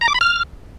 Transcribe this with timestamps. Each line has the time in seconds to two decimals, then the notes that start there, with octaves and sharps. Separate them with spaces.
0.01 A#5
0.08 D6
0.14 B5
0.21 F6